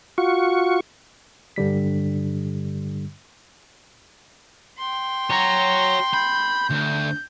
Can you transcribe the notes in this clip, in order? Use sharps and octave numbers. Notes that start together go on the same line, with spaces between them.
F4 F#4 C#6
G2 D3 G3 B6
G5 C6
F#4 C#5 A#5
B5 G6
D2